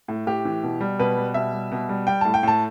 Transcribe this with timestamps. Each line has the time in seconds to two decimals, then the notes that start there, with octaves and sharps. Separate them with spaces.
0.08 A2
0.27 A2 G4
0.45 E3
0.63 B2
0.81 G3
0.99 B2 B4
1.18 G3
1.34 B2 E5
1.53 G3
1.72 B2
1.89 G3
2.07 G3 G5
2.21 A2 A5
2.34 G5
2.43 A2 A5